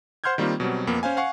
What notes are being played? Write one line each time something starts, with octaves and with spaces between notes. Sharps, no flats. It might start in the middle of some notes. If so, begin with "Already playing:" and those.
C5 F#5 C6 F6 G6 G#6
D#3 G3 A#3 C4 F4
B2 F#3 G3 C4
F2 A#3 B3
C#4 C5 F5 G#5
F5 F#5 G#5 C#6 C7